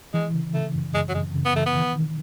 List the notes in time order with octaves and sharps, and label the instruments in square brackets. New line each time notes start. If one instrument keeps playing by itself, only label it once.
[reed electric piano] E3 [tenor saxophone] G#3
[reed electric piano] C#3
[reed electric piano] C#3 [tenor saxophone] A3
[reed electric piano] F#2
[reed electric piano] F#2 [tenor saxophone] G#3
[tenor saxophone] F#3
[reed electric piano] F#2 [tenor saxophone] G#3
[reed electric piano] C#3
[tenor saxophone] B3
[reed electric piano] E3 [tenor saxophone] A3
[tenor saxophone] B3
[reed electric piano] D#3
D#3